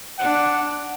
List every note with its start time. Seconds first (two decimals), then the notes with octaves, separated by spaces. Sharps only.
0.19 D4 F#5